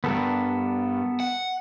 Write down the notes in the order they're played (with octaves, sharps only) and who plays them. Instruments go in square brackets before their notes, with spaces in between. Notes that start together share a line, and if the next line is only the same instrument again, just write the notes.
[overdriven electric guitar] D2 G2 [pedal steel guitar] B3 A4 A#4
[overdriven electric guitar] F#5